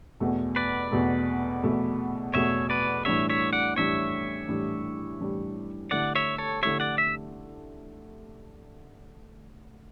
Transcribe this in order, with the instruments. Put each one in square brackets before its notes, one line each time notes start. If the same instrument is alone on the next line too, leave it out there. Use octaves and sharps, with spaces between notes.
[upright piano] E2 B2 A3
[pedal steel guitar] B4 D5
[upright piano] E2 B2 A3
E2 B2 A3
[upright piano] E2 B2 A3 [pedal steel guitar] C#5 E5
[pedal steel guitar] B4 D5
[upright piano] A2 E3 G3 D4 G4 [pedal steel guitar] C#5 E5
[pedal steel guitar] C#5 E5
D5 F#5
[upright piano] A2 E3 G3 D4 G4 [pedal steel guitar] C#5 E5
[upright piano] A2 E3 G3 D4 G4
A2 E3 G3 D4 G4
[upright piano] D3 A3 E4 G4 [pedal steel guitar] D5 F#5
[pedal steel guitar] C#5 E5
A4 C#5
[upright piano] D3 A3 E4 G4 [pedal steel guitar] C#5 E5
[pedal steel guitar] D5 F#5
E5